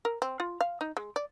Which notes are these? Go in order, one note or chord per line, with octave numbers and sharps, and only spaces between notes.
A#4
C4
F4
F5
D#4
G#3
D5